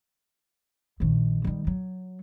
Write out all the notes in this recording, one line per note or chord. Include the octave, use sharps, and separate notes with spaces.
A#1 D#3
D#3 G3
F#3